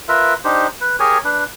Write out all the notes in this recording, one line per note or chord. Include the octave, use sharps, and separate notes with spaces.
F4 A#4 B4 E5
D4 D#4 G4 C5
B4
G4 G#4 A#4 C#5 G#5
D4 B4